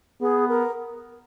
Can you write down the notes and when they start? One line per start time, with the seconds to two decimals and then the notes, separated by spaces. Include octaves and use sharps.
0.21 B3 G#4
0.48 A#4